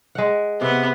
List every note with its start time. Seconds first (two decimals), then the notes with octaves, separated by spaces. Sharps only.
0.15 G#3 F#5
0.61 C3 B3